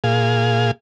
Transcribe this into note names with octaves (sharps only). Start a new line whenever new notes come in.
A#2 G#4 F5